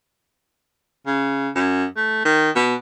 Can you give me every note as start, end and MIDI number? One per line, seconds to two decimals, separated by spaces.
1.07 1.49 49
1.55 1.85 42
1.97 2.25 57
2.25 2.50 51
2.56 2.75 47